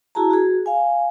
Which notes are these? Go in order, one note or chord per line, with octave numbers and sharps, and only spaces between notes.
E4 F#4 G#4 A5 A#5
F#4 G#4
F5 G#5